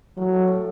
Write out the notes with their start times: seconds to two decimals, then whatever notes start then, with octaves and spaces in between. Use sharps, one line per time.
0.17 A2 F#3
0.33 A3
0.48 A2